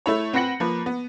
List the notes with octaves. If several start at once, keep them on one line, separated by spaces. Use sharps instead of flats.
A3 E4 C#5
C4 B4 F#5 A#6 C#7 F#7
F3 A#3 B4
B3